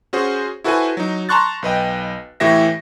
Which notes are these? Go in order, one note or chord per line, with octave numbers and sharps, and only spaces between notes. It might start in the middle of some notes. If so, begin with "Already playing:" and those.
C#4 F#4 G#4 C5
E4 F#4 A4 B4 C5 G#5
F#3 D#4
A5 A#5 C6 C#6 F#6 A6
B1 B4 D#5 G5
A2 E3 G4 E5 A#6